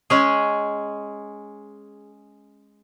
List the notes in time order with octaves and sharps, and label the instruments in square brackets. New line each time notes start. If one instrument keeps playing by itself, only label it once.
[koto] G#3 C#4 G#4